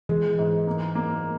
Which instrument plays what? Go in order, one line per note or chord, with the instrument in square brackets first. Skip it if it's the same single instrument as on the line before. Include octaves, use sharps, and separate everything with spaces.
[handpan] E3 [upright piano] G#3
[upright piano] G#2
A#3
A#3